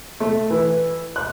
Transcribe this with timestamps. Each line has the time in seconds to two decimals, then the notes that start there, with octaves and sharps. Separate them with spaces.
0.20 A3
0.50 E3
1.16 F#6